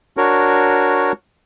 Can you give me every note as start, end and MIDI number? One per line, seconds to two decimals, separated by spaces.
0.17 1.12 62
0.17 1.12 66
0.17 1.12 70
0.17 1.12 73